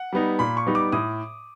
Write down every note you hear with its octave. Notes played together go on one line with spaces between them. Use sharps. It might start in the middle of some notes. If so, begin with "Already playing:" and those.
Already playing: F#5
G3 B3 D#4
A#2 B5
C#6
G3 B3 D#4
D6
A2 D#6